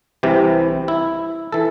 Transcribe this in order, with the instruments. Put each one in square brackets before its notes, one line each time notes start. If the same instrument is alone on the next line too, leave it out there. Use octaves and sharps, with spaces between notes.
[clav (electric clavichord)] C2 C3 E3 G4
E4
E3 A4